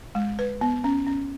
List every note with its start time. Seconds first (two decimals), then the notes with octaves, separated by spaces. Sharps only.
0.15 G#3
0.39 B4
0.61 B3
0.84 C#4
1.07 C#4